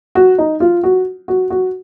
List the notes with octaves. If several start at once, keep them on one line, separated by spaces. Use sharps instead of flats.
F#4
D#4
F4
F#4
F#4
F#4